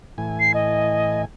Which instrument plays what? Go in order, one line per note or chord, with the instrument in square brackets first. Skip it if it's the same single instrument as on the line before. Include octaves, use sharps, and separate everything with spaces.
[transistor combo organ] A2 E3 G#5
[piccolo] C7
D#5